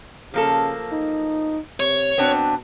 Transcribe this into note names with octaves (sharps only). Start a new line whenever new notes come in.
C#3 F3 A#3 A4
D#4
C3 C#5
B2 B3 C4 D4